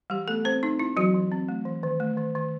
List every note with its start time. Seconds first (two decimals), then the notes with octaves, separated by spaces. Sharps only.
0.10 E3 G3 G4
0.27 A3 B3 A4
0.44 A3 C4 C5
0.63 C4 D#4
0.79 C4 E4
0.97 E3 F#3 F#4
1.14 E3
1.32 C4
1.49 A3
1.65 E3
1.83 D#3
2.00 A3
2.17 D#3
2.35 D#3